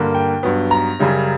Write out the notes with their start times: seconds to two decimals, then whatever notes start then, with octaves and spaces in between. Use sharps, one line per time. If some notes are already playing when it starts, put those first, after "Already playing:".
Already playing: G2 D3 A#3
0.15 G5
0.43 G2 F#3 B3
0.71 A#5
0.99 F#2 C#3 G3